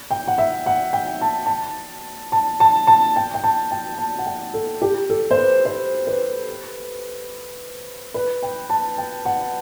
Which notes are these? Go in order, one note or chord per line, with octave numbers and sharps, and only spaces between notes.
G5
F#5
E5
F#5
G5
A5
A5
A5
A5
A5
G5
G5
A5
G5
A5
F#5
G5
A4
G4
A4
C5
B4
C5
B4
B4
G5
A5
G5
F#5